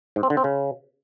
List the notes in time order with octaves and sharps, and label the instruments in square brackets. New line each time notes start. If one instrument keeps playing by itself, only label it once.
[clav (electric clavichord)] G#2
C4
D3
C4
C#3